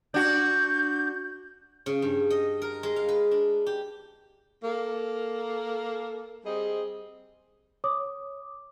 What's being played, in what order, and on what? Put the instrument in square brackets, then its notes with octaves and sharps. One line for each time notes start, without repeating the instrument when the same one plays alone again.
[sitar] D4 F#4 [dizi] G6
[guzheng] C#3
G2
D#5
A#4
G#3
F5
B4
D4
G4
[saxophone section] A#3 A4
G3 C4 G#4 D#5
[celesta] C#5 D6 D#6